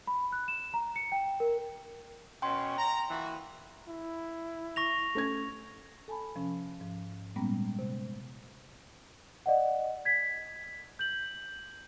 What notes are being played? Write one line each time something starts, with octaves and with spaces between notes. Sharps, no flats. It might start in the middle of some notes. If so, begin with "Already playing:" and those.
B5
F#6
E7
A#5
C#7
G5
A#4
B2 C#4 G5 C6
A#5
A#2 E3 F#4
E4
C#6 A#6 F7
A3 C#4 G#6
A4 G#5 A5 B5
C3 F3 C#4
G#2 F3
A#2 G3 G#3 A#3 B3 C#4
C3
D5 D#5 F#5
G#6 B6
G6 F#7